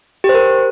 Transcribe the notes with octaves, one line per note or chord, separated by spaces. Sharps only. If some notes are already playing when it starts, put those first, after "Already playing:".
G4
C5
A#4